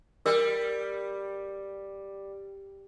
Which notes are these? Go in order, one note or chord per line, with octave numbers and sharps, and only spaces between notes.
G3 A#4